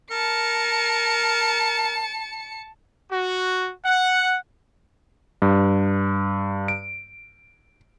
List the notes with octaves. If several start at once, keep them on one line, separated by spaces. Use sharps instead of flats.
A#4 A5 C#7
F#4
F#5
G2
D7